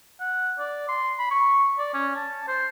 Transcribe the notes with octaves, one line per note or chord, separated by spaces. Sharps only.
F#5
D5
C6
B5
C#6
D5
C#4
A5
C5